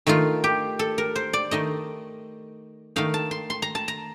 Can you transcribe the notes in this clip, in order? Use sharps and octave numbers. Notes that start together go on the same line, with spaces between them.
D#3 A3 D#4 F4
G4
A4
A#4
C5
D5
D#3 A3 D#4 D#5
D#3 A3 D#4 F5
A5
C6
C6
A#5
A5
A#5